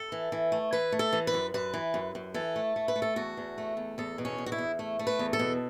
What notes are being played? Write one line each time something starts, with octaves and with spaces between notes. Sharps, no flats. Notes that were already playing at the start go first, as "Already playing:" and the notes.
Already playing: A4
E3
E3
A3
E3 B4
A3
A4
E3
B4
F#2
F#2 B4
E3
F#2
F#2
E3 A4
A3
A3
B4
A3
A4
E2 F#4
E2
A3
E2
E2 A4
B2
C#4
E2
F#4
E4
E2
A3
A3
B4
E2
A4
B2